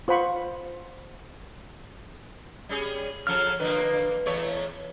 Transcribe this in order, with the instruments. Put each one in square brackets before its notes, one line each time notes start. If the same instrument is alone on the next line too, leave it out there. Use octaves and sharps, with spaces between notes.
[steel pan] F4 C5 F#5 B5 C#6
[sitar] G3 C#4 G#4
[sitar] C#3 F3 A4 [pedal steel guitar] F6
[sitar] D3 F3 A#3 [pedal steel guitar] B4
[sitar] E2 A3 C#5